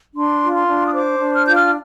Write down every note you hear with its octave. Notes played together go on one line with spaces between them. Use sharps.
D4 C6
F4
C6
D4
D#6
C5 D6
D4
F6
F4 G6
F6